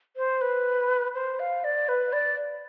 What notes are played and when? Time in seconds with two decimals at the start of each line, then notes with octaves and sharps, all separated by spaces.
0.16 C5
0.41 B4
1.15 C5
1.39 F5
1.64 D5
1.88 B4
2.13 D5